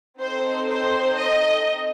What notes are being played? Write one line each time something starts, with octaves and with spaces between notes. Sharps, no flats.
C4 D#4 A4 C5
C5
D#5